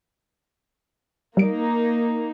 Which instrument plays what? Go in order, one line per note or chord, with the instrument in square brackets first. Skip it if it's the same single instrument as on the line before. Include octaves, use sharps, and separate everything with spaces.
[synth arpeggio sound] G3 D7 [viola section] A#3 D#4